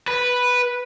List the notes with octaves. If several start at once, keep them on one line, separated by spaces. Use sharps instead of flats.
B4